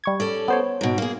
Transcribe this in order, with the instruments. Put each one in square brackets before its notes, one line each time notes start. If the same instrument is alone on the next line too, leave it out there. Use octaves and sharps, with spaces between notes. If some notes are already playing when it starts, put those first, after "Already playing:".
[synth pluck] G3 C#6 G#6
[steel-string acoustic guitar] C#4 A4 D5
[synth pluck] B3 C5 C#5
[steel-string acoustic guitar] G#2 B2
A#3 G#4